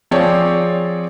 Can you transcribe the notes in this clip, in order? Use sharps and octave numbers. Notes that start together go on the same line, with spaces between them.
F3 C4 G#4 C#5 D5